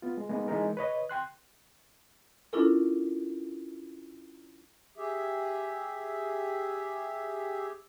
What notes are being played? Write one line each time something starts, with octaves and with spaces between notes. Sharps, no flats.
B3 F4
G#3
G#3 A#3 B3 D#4
E3 G#3 D#4 A#4
B4 C#5 D#5
G5 C6 F#6
C#4 D4 E4 F4 A4 A#4
G4 G#4 E5